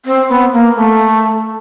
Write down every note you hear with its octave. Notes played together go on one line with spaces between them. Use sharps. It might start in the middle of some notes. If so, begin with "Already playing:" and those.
C4
B3
A#3
A3